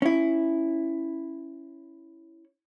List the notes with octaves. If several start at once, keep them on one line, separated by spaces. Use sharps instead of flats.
C#4 E4